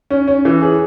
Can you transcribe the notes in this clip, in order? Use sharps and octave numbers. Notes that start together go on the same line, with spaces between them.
C#4
C#4
E3
G#4